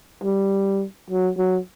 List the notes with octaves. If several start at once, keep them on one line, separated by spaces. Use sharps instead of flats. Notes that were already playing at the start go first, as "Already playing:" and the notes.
G3
F#3
F#3